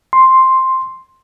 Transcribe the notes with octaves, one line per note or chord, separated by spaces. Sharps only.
C6